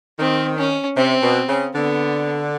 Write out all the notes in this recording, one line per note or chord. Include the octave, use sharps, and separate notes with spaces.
D#3 C4
C#4
C3 C4
B2
C#3
D3 B3